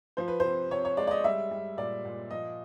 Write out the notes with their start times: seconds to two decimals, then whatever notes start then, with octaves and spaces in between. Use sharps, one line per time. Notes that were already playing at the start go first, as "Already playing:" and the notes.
0.17 F3 C5
0.28 B4
0.40 C3 C5
0.71 C3 C#5
0.85 C#5
0.97 G#3 D5
1.07 D5
1.11 D#5
1.24 G3 E5
1.51 G3
1.77 A#2 D5
2.05 A#2
2.31 F3 D#5